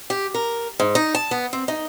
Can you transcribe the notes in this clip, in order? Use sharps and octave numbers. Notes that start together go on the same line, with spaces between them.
G4
A#4
G#2
D#4
A5
B3
C4
D#4